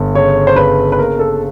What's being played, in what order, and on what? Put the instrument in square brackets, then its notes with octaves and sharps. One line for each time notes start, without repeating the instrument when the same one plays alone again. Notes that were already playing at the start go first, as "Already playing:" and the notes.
Already playing: [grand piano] G1
[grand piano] C#3 [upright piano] C#5
[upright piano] C5
[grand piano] C#3 [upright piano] B4
[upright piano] B4
[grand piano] A#3 [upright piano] A#4
[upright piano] A4